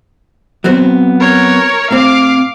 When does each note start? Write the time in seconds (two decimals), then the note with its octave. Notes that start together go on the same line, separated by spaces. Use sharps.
0.64 F#3 B3 C4
1.20 A#4 C#5
1.91 A2 C4 F5 D6